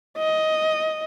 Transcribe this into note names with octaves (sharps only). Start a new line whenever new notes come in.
D#5